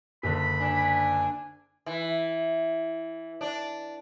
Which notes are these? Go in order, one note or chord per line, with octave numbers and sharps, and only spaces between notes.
F#1 D3 B5
D4 G#5
E3
D4